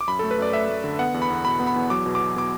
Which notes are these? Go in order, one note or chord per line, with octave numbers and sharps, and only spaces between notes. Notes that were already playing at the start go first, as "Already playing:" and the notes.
D6
F#2 B5
A3 A4
B4
F#2 D5
A3 E5
A3
D3
B3 F#5
E2
B5
E2
B2 B5
B3
B5
E2
F#3 D6
B2
D6
F#3
B2 D6